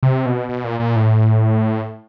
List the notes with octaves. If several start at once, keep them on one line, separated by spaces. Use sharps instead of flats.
C3
B2
B2
A#2
A#2
A2